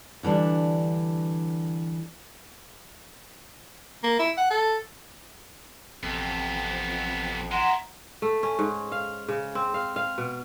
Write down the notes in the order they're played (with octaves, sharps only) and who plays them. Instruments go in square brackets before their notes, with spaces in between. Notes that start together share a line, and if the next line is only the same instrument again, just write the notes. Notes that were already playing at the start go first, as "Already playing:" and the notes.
[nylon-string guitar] D3 E3 G3 D4
[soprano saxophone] A#3
E4
F#5
A4
[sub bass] A1 [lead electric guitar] F2 [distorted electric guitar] C3 B3
[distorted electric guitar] G#3 E4 [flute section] F#5 A#5 C6
[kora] A3
C#4
G#2
F5
C#3
C4
F5
F5
B2